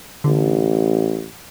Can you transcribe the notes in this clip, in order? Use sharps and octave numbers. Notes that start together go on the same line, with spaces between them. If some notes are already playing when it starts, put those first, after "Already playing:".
A1 D3